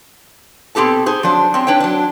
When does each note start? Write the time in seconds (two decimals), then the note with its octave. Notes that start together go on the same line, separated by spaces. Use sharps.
0.75 B2 C4 G4 A4 A5
1.06 G#4 C5
1.23 F3 F#3 D4 C5
1.54 C4 C#4
1.67 D4 B4 C#5 G5
1.80 F#3 D4